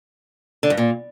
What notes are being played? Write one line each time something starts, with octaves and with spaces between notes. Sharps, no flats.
D3
G2
A#2